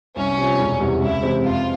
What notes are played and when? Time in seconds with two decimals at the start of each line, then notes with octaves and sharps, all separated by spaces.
0.16 C2 C#4
0.37 C3 F3
0.59 E1
0.80 E2 C3 G3
1.01 C#2 E4
1.23 C3 E3 G#3 C4
1.44 F2 F4